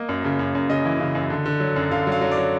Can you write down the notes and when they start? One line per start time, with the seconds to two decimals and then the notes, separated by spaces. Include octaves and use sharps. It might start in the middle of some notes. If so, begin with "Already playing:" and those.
Already playing: A#3 D#5
0.09 F#2
0.24 C#3
0.39 F#2
0.55 F#2
0.70 C#3 D#5
0.85 E3
1.00 C#3
1.15 F#2
1.30 D3
1.46 D3
1.60 F#3
1.76 F#2
1.91 D3 F5
2.07 F#3 F5
2.21 F#3
2.32 D5
2.37 F#3